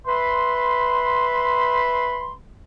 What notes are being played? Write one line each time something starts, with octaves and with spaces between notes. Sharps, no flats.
B4 E5 B5 C6